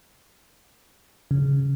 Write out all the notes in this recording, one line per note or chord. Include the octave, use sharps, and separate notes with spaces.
C#3